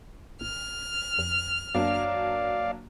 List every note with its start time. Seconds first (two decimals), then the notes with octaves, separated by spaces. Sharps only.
0.41 G#1 F6
1.19 F2
1.75 F#2 F#3 A#3 D4 D5 F5